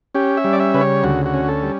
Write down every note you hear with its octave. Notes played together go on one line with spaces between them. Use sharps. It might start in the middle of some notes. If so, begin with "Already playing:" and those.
C#4 G4
E5
G3
D5
E5
C#3 B4
C#5
D2 F#4
F#4
C#4
A4
G3